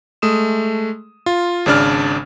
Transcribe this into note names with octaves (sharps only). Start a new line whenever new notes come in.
G#3 A3 D#6 E7
F4
G#1 C#3 D4 D5 F6